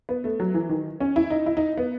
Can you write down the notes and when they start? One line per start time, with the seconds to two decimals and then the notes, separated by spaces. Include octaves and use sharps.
0.09 B3
0.24 A3
0.40 F#3
0.54 E3
0.69 D#3
1.00 C#4
1.16 E4
1.30 D#4
1.46 E4
1.57 D#4
1.78 B3